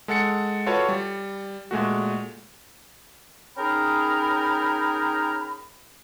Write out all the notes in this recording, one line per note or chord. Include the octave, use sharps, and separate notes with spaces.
G#3 A4 F#5 A6 C#7
F4 F#4 A4 B4 C#5 F5
G3
A#2 G#3 A3 F#4
C#4 D#4 G#4 A#4 G5 B5